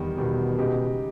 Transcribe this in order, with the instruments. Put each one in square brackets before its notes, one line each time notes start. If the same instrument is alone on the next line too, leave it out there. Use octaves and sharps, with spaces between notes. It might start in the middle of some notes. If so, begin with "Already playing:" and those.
Already playing: [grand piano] E2 D#3 G3
[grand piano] E2 D#3 G3 [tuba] B2
[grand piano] C#3 G#3 D#4 G4